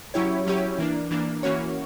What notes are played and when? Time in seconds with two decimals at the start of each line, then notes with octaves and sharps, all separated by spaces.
0.14 F#3 C#4 E4 G4 C#5
0.47 F#3 C#4 E4 G4 C#5
0.79 E3 A#3 D4
1.11 E3 A#3 D4
1.43 E3 A#3 C#4 F#4 C#5